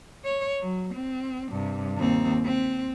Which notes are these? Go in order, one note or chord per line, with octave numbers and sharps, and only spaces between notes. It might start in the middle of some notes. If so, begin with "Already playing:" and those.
C#5
F#3
C4
G2 C3
D#2 C4
C4